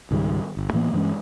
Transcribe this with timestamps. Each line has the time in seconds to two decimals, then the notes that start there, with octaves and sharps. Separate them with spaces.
0.11 C#2 G#2 D#3 G3
0.57 G1
0.73 A2 E3 A#3 B3
0.93 G2 E3 G#3 C#4